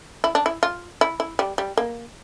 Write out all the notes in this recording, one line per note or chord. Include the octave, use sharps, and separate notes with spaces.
E4
D4
E4
F4
E4
E4
G3
G3
A#3